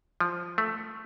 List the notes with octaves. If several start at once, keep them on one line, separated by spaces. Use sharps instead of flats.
F3
A3